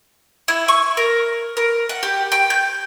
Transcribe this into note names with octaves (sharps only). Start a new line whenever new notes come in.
E4
C#6
A#4
A#4
F#5
G4
G5
G6